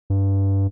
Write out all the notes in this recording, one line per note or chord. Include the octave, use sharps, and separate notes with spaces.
G2